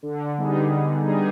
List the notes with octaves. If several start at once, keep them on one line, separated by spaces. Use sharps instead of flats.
D3
G3 B3 D#4 G#4
D3
G3 B3 D#4 G#4